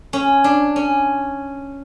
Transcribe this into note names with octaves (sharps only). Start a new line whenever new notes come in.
C#4
D4
C#4